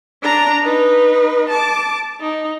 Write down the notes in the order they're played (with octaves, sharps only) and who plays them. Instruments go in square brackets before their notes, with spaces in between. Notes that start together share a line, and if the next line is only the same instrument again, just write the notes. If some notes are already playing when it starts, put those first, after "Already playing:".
[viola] D4 A#5
D#4 B4
A5 D6
D#4